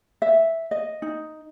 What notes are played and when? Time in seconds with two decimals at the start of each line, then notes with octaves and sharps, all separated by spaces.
0.22 E5
0.71 D#5
1.02 D#4